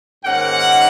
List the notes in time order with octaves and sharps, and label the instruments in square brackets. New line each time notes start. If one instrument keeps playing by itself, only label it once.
[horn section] G#2 D#3 A#3 C#4 F#5